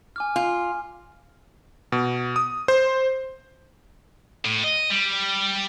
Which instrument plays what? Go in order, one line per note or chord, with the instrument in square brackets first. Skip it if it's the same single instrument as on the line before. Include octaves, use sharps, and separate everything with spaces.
[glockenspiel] G#5 D6 F6
[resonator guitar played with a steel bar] F4
[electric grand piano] B2
D#6
C5
[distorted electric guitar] A2
D#5
G3